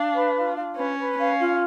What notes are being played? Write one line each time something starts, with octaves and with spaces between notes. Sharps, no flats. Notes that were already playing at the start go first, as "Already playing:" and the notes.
Already playing: D4 F5
B4
F4
F4
C#4 B4
B4
C#4 F5
F4